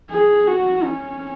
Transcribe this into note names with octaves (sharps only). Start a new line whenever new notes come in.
G#4
F#4
C#4